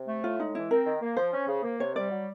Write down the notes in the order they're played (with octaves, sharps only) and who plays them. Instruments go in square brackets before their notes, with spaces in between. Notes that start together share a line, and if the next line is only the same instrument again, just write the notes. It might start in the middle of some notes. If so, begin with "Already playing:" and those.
Already playing: [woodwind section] C3
A3
[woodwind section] A2 [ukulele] F4
[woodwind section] G#3 [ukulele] D#4
[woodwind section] E3 [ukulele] E4
[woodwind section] C4 [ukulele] A#4
[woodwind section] D#3
A#3
[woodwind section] F3 [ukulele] C5
[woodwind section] C#4
C#3
A#3
[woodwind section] C3 [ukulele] C#5
[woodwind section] G3 [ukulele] D5
[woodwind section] F#3